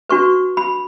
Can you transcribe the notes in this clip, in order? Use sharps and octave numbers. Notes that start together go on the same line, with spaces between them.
D4 F#4 B4 C#6
B5